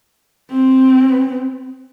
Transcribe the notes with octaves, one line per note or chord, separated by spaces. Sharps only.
C4